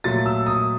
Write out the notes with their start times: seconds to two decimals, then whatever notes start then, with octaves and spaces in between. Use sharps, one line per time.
0.04 A#2 F#3 A3 A6
0.26 E6
0.47 D#6